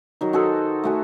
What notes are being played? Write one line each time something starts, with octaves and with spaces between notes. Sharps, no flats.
D#3 F#3 D#4
F#4 G#4 A4 C5
A3 F#4 G#5